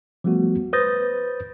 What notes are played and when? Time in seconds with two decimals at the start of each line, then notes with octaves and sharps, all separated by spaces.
0.24 F3 G3 A3 B3 F#4
0.73 B4 C5 D#6 G6 A6 A#6